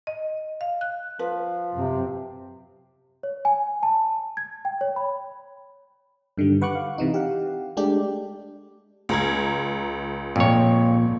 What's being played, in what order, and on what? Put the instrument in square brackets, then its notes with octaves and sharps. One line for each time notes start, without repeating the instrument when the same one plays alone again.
[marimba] D#5
F5
F#6
[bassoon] F3 [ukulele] B4
[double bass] F#2 C4 [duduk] C3
[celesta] C#5
G#5
A5
G#6
G5
C#5
B5
[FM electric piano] G2 D3 D#3 G3
B4 F#5 C#6 D6 F#6
F5
C3 E3 D#4
G4 F5 F#5
G#3 A3 D4 G4
[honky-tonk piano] C#2 A#5 G#6
[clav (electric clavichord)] F2 C#5 [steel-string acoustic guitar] A#2